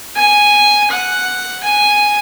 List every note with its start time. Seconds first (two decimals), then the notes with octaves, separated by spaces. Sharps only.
0.15 G#5
0.90 F#5
1.63 G#5